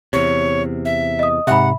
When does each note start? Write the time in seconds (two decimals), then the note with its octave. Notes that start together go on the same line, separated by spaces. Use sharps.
0.13 E2 C3 C#5
0.85 E5
1.19 D#5 D#6
1.47 G#2 C3 E5 F#5 B5